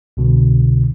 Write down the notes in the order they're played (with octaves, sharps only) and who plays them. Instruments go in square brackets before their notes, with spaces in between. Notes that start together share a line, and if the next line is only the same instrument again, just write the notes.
[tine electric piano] C2 B2 D3